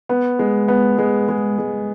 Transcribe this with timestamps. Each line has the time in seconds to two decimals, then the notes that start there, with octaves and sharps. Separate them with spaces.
0.09 B3
0.39 G#3
0.68 B3
0.98 G#3
1.29 G#3
1.58 G#3